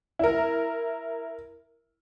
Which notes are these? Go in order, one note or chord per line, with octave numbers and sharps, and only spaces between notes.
E4 A#4